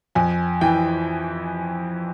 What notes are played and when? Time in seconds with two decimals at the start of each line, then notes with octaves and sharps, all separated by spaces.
0.15 F2 G#5
0.61 E3 G5